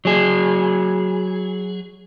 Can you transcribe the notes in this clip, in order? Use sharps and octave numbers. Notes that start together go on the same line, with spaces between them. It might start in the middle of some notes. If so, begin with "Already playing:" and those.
F#3 G#4